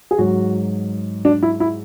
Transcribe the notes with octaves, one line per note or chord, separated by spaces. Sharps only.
G#4
G#2 F#3 F#4
D4
E4
E4